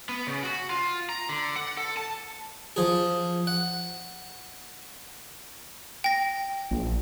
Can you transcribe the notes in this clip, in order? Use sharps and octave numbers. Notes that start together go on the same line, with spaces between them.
B3
C#3
F#4
F4
A#5
D3
F#5
A4
A5
F3 G#4
F#5
G5 A#6
A#1